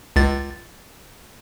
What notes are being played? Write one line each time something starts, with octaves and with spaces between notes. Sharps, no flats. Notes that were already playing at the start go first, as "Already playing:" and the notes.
C#2 A6